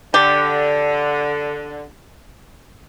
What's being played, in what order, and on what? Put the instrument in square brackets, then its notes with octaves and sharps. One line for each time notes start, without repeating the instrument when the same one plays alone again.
[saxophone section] D3 [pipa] G4